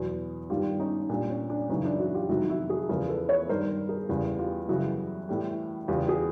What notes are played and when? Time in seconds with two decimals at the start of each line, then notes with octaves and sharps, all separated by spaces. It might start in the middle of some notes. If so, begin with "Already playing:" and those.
Already playing: E2 B2 F#3
0.50 G2 D#3 G3 F4 G4
0.79 C#4 D#4
1.09 A#2 G3 D4
1.30 C#4
1.50 D4
1.69 F#2 C#3 E3 C#4 D#4
1.85 D4 E4
1.99 E4 F#4
2.14 F4 G4
2.29 F2 C3 D#3 F#3 E4 F#4
2.49 E4 F#4
2.69 F#4 G#4
2.89 E2 C#3 F3 G#4 A#4
3.09 A4 B4
3.29 B4 C#5
3.49 G2 D#3 G3 A#4 C5
3.89 G#4 A#4
4.09 E2 C#3 E3 G3
4.39 F4 G4
4.69 F#2 C#3 E3 G3 E4 F#4
5.29 A2 E3 G3
5.88 E2 C#3 E3 G3 F4 G4
6.08 F#4 G#4